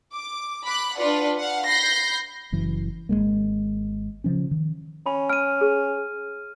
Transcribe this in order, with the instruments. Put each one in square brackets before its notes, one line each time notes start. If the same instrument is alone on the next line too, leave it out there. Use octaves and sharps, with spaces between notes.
[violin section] D6
B5 D6 F#6
D4 F4 B4 D5 F#5
F5 F#5
B5 G6 A#6 C7
[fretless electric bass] F#1 F#2 E3
G#1 D#2 G#3 A#3
C#3 F3 C#4
D#3
[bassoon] C#4 [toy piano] B5
[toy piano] G#5 [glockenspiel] F6 D#7
[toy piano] G#4